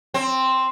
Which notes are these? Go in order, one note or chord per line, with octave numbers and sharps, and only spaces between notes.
C4